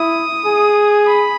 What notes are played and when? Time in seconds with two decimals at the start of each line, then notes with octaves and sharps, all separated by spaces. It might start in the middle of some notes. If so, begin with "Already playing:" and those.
Already playing: E4 D#6
0.46 G#4
1.07 B5